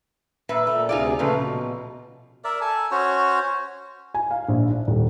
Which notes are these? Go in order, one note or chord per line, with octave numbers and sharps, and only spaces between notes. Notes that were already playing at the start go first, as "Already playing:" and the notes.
A#2 B4 E5
A#2 A3
D2 C3 D#4 F4 G#4 D5
A#2 C#3 F3 A3 A4 B4
B2
A#4 D5 E5
A4 G#5 A5
C#4 F#4 C5 C#5
G#5
F5
A#1
D4
D#1